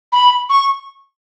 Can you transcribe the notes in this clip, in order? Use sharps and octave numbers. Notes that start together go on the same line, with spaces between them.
B5
C#6